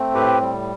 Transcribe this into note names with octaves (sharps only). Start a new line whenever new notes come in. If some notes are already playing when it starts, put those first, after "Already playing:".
Already playing: A3 C4
A2 G4 B4
G3